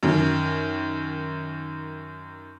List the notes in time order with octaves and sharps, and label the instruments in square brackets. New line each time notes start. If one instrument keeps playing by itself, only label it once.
[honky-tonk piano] F#2 D#3